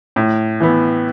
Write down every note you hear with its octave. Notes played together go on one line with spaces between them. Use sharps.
A2
E3 B3